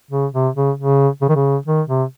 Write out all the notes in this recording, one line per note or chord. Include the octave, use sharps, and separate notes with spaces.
C#3
C3
C#3
C#3
C#3
D#3
C#3
D#3
C3